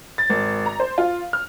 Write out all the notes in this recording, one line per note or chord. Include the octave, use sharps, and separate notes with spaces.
A6
G#1
A#5
C5
F4
F6